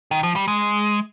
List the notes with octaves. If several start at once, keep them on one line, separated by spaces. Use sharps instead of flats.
D#3
F3
G3
G#3